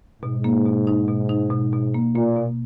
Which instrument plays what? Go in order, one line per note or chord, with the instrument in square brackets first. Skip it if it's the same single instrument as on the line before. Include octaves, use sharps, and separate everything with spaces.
[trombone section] G#2 [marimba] B2
[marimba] A#3
B2
D#4
B2
D#4
B2
B2
A#3
[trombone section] A#2 [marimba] A#3
[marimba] B2